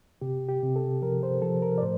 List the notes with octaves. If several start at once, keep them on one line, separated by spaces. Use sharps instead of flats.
C3 G4
G4
C3
A4
F3 A#4
C5
F3 A4
A#4
D5
A2 C5